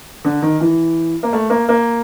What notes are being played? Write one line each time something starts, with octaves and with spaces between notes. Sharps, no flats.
D3
D#3
E3
A#3
A3
A#3
A#3